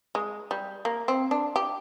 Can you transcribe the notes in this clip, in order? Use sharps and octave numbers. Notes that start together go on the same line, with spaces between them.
G#3
G3
A#3
C4
D4
G4